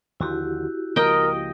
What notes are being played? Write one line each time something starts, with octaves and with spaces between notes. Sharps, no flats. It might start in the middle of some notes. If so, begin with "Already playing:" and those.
D#2 D3 F3 E4 F#4 G4
C#2 F3 A#3 A#4 D#5 G5